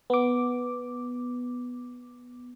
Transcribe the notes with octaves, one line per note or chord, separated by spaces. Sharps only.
B3 D6